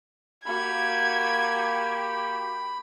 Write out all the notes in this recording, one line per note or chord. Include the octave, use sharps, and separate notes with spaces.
A#3 F#4 G4 B5 G#6